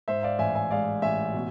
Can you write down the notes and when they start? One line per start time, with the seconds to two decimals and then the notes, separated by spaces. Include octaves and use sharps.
0.08 G#2 C5 E5
0.23 D5 F5
0.39 A1 E5 G#5
0.55 E5 G#5
0.71 G#3 D5 F5
1.02 A1 E5 G#5
1.34 B2